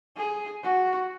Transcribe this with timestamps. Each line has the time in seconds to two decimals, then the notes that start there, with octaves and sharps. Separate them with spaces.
0.17 G#4
0.63 F#4